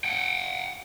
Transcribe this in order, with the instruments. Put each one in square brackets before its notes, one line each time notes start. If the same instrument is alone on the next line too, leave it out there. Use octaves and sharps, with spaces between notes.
[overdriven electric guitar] F#5 G5